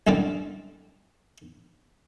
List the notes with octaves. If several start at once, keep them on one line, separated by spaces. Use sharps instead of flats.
C2 F#2 D3 C4 D5